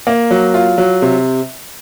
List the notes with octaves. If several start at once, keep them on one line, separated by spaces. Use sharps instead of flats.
A#3
F#3
F4
F#3
C3